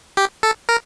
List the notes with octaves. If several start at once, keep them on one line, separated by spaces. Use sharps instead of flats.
G4
A4
A#4